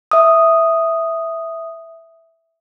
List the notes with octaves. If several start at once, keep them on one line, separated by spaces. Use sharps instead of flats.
E5 D#6